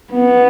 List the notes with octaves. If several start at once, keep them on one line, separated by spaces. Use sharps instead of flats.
B3